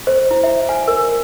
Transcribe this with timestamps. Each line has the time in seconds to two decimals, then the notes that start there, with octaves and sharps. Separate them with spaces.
0.07 C5
0.31 E4
0.43 E5
0.69 G#5
0.88 A#4